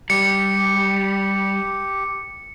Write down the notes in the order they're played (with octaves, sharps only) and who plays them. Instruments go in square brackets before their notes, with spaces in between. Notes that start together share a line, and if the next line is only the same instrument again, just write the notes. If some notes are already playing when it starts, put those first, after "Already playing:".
[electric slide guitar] G3 [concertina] G4 [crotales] C#7